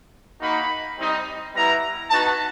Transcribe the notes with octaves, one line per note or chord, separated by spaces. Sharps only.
A#3 D#4 F#4 B5
G3 C4 D#4
G3 B3 E4 A#5
B3 D#4 F#4 A5